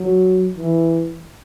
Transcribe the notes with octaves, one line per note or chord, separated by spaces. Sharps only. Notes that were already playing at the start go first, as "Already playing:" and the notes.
Already playing: F#3
E3